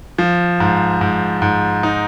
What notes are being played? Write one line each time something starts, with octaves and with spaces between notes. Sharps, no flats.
F3
G#2
G#2
G#2
D#4